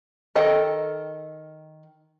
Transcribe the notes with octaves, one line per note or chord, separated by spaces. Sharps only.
D#3 A4 D#5 G5